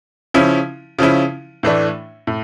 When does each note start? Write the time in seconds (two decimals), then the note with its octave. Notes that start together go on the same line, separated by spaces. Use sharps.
0.34 C#3 F3 C#4 E4
0.99 C#3 F3 C#4 E4
1.63 A2 E3 A3 D4
2.27 A2